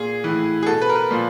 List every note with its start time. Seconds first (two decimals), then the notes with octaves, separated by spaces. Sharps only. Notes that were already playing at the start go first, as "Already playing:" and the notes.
Already playing: A#2 G#4
0.24 A2 E3
0.63 G#4
0.66 B2 A4
0.82 B4
0.89 A#4
0.96 B4
1.11 A#2 F3